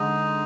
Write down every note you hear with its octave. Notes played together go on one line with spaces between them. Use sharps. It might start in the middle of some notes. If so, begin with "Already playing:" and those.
Already playing: D3 G#3 D#4